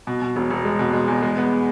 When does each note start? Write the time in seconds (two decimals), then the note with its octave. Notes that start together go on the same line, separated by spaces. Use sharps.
0.07 B2
0.22 B2
0.36 E1
0.50 E1
0.65 G#3
0.79 B2
0.93 G#3
1.08 E2
1.22 G#3
1.37 B3